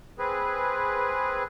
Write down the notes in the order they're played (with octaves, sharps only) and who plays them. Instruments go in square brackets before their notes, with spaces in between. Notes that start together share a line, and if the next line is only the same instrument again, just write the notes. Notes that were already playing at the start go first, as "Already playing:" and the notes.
[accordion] C4 G#4 B4